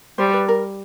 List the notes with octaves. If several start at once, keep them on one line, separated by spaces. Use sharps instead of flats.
G3 C5
B4
A#4